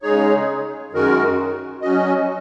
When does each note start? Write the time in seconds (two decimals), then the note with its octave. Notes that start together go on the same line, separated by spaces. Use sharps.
0.02 C#3 G#3 D#4 G#4 C#5
0.92 F#2 D#3 G#3 F#4 A#4
1.82 F#3 C#4 F#4 D#5